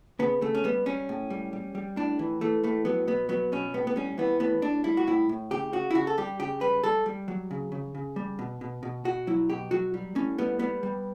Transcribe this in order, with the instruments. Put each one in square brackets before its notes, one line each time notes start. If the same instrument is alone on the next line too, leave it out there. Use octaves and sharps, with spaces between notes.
[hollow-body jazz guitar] C#3 B3
C#3 A3
C#4
G3 B3
G3 C#4
A2
G3
G3
G3
A2 D4
E3
E3 A3
A2 A3
F#3 B3
B2 B3
F#3 B3
B2 C#4
A2 B3
B3
G3 C#4
E3 B3
A2 B3
A2 D4
G3 E4
F#4
A2 E4
A2
C#3 G4
C#3 F#4
E4
C#3 F#4
A4
G3 G4
C#3 G4
G3 B4
G3 A4
G3
F#3
C#3
C#3
C#3
G3
B2
B2
B2
B2 F#4
F#3 E4
B2 G4
F#3 F#4
G3
A2 C#4
G3 B3
G3 B3
G3